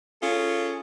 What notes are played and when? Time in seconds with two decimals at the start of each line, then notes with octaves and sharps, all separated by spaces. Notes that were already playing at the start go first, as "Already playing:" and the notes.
0.22 C#4 F4 G#4 A4